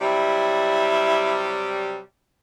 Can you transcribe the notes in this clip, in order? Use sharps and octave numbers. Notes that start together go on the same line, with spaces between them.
C3 F#3 G3 E4